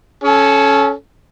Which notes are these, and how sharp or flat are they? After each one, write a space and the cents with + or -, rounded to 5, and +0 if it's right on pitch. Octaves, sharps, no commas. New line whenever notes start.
C#4 +0 A4 -30